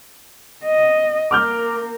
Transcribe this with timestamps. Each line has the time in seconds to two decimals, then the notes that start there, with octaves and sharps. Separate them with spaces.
0.65 D#5
1.31 A#3 A#4 D6 F6 G6